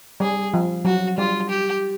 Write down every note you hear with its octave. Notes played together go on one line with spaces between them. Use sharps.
G3 G#4
F3
F#3 F#4
G3 F4
G4